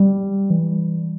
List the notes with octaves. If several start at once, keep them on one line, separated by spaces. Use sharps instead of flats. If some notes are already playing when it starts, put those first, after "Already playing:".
Already playing: G3
E3